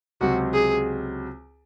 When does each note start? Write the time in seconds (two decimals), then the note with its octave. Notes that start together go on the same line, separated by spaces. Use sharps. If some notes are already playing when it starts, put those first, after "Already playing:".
0.21 C#2 C3 F#3 C4 F#4
0.53 G#4